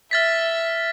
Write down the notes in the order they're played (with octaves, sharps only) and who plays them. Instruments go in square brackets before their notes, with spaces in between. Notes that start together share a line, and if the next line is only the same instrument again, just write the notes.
[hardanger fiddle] E5 [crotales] F6 A6 B6